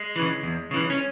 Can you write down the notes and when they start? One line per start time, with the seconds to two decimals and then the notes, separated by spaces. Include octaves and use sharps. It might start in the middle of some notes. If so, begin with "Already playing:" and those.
Already playing: G#3
0.16 C#3 E3
0.43 E2
0.71 C#3 E3
0.90 C#4